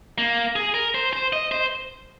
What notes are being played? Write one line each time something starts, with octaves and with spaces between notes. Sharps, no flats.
A#3
G#4
A#4
C5
C5
D#5
C5